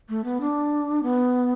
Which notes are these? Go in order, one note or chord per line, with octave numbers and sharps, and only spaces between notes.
A3
B3
D4
B3